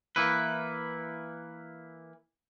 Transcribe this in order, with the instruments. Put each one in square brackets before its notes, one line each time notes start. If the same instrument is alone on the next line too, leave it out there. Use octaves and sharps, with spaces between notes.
[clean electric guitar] E3 A#3 E4 B4